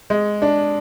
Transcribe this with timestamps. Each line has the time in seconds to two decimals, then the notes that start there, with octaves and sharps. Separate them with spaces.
0.10 G#3
0.42 D4